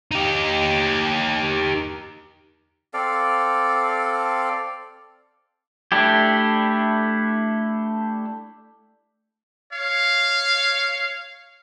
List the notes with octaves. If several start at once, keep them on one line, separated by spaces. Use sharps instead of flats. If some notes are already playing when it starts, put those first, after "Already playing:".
D#4 G4
C4 A4 D5 F5
A3 D4 E4 G4
C#5 F5